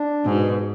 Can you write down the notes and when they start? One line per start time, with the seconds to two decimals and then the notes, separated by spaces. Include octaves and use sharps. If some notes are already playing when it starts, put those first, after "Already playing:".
Already playing: D4
0.25 G#2 B2